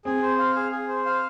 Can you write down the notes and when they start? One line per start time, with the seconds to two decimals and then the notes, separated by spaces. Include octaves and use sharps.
0.05 C4 G#4
0.22 C5
0.39 F5
0.56 G#4
0.72 G#4
0.89 C5
1.05 F5